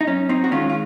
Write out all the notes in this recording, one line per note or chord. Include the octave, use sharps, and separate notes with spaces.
D#4
F#2 C#4
C4 D#4
F#4
D#3 G#3 C#4 F4
F4